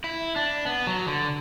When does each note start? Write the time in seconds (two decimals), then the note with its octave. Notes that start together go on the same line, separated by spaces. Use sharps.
0.04 E4
0.36 D4
0.66 B3
0.87 F#3
1.08 D3